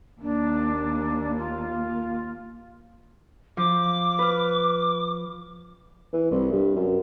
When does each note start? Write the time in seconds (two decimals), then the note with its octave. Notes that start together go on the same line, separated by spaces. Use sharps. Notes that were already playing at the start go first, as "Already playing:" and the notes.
0.21 D#2 A#3 D4
1.38 F4
3.57 F3 D6
4.19 B4 F6
6.13 E3
6.32 C2
6.53 G2
6.76 F#2